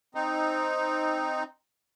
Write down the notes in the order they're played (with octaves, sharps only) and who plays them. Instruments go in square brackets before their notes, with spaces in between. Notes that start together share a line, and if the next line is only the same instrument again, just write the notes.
[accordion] C4 D#4